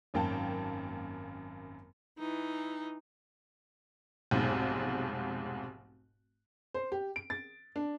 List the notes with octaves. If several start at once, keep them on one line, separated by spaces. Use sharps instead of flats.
G#1 F#2 A#3 G5 A5
E3 D#4
F1 B1 G#2
C5
G4
D7
A6
D4